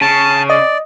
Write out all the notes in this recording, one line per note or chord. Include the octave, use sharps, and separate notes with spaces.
C#3 A5
D5 D#5